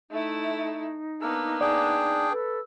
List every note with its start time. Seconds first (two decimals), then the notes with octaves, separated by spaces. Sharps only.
0.11 A3 D#4 E4
1.22 A#3 B3 D4 A#4 E6
1.61 D4 G#4 D5 G5
2.32 A4 B4 E6